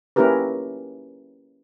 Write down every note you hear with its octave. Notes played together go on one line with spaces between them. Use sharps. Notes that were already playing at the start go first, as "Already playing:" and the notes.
A#3 C#4 E4 G4 A#4 B4